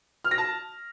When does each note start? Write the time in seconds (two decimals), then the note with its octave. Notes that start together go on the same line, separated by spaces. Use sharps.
0.24 F6
0.31 A#6
0.38 A5